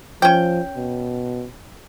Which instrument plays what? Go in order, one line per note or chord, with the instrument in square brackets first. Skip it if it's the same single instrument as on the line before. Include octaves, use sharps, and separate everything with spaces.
[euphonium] F3 [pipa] C#4 G5
[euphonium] B2